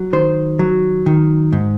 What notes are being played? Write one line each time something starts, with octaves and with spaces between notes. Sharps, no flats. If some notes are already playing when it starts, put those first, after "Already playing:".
Already playing: F#3
D#3 C5
F#3
D#3
G#2